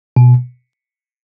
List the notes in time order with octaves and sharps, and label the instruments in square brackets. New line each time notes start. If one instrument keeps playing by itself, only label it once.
[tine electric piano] B2